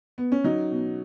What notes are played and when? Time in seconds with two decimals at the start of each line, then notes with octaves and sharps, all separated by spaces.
0.18 B3
0.32 C#4
0.44 F#3 D#4
0.72 B2